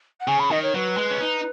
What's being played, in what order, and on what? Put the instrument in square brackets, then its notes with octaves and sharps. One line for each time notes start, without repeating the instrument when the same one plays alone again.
[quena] F#5
[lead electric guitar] C#3 [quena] G#5
[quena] B5
[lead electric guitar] D#3 [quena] D#5
[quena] C#5
[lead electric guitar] F#3 [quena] B4
[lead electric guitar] G#3
C#4
D#4